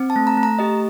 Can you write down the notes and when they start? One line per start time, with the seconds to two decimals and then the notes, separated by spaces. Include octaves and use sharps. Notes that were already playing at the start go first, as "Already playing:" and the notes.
Already playing: C4
0.10 A5
0.16 A3
0.27 A#5
0.37 A3
0.43 A#5
0.59 G4 D#5